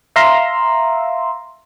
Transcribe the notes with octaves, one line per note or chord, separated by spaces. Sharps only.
E5 F5 A#5 C6 E6